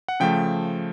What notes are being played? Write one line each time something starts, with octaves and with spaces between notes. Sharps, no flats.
F#5
C#3 F3 A3 G5